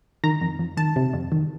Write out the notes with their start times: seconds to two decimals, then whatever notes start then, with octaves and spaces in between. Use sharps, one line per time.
0.24 D#3 A#5
0.41 F2
0.59 F2
0.77 D#3 A5
0.96 C3
1.13 F2
1.32 D#3